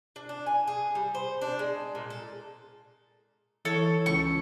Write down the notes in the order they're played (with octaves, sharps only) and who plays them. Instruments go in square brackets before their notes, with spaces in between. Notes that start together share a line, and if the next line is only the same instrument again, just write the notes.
[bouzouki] D4
D4
G#5
G#4
G3
C5
D4
G#3
A#2
A4
[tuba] E3 [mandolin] A4 C#5
[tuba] C#2 [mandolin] C#6